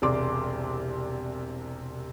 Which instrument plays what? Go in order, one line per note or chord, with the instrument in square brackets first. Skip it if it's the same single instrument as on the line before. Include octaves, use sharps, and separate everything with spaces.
[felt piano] E1 C2 C3 D5 C6 D6